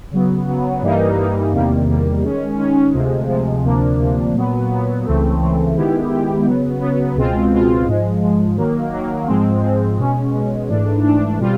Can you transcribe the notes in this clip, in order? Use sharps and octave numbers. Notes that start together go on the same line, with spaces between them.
C#3 F#3 B3
C#3 F#3 B3
G2 E3 G3 A#3 D#4
G2 E3 G3 A#3 D#4
E2 C3 D#3 G3 A#3
E2 C3 D#3 G3 A#3
D#3 G#3 C#4
D#3 G#3 C#4
D2 C3 F3 G#3
D2 C3 F3 G#3
D2 C3 F3 A#3 D4
D2 C3 F3 A#3 D4
A#2 F#3 B3
A#2 F#3 B3
C#2 C#3 E3 A3 C4
C#2 C#3 E3 A3 C4
D#3 G#3 B3 E4 G4
D#3 G#3 B3 E4 G4
C#3 F#3 B3
C#3 F#3 B3
C#2 B2 G#3 C4 F4
C#2 B2 G#3 C4 F4
G#2 F3 G#3
G#2 F3 G#3
D#3 F#3 A#3
D#3 F#3 A#3
G#2 F3 G#3 C4
G#2 F3 G#3 C4
B2 G#3 C#4
B2 G#3 C#4
G#2 E3 A3 D4
G#2 E3 A3 D4
B2 G3 C4 F4